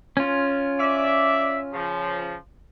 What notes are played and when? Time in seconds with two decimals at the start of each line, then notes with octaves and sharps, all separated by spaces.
0.17 C#4 F4
0.79 D5 E5
1.73 C#3 F3